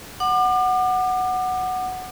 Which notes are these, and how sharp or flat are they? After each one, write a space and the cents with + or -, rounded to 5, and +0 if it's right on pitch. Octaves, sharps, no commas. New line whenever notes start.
F#5 +0 D6 +35